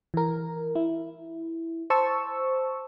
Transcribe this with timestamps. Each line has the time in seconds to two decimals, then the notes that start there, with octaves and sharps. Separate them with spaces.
0.14 E3 A#4
0.75 E4
1.90 C5 A5 C#6 E6